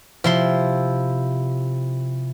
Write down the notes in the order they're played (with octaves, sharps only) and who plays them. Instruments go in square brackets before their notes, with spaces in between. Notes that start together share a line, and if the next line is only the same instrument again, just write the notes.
[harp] C3 [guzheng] F3 E4 C6